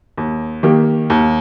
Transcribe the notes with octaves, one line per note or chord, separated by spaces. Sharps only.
D#2
D#3 A#3 G4
D#2